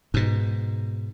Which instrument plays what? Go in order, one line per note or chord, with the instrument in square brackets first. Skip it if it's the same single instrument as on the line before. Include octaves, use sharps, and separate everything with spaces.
[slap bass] G#2 B2